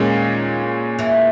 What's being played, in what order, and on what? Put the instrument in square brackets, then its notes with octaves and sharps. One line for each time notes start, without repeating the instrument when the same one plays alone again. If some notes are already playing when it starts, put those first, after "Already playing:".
Already playing: [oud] D#2 D#3 [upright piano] A#2 G#3 C#4
[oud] E2 E3